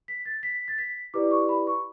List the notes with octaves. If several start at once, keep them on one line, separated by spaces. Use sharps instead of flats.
B6
A6
B6
A6
B6
E4 G4 B4 D5 D6
C#6
B5
C#6